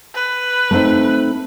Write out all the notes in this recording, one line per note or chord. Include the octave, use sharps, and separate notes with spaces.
B4
A3 C4 D#4